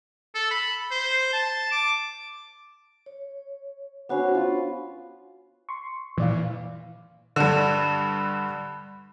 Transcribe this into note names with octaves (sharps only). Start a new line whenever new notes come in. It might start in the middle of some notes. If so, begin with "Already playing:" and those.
A4
B5
C5
A5
D6
C#5
B3 C#4 D4 F#4 C5
F4
C6 C#6
A#2 E3 D5 F5
G2 D3